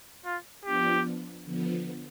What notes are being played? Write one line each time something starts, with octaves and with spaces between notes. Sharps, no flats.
F4
F3 B3 D4 F4 G4
D3 F3 B3